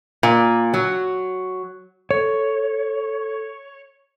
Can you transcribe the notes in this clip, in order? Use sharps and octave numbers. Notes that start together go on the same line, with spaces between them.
A#2
F#3
A4 C#5